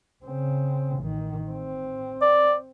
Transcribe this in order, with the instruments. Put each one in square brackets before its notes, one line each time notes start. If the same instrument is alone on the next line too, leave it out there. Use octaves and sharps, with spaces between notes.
[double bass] C#3 C4
A1 D#3
C4
[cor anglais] D5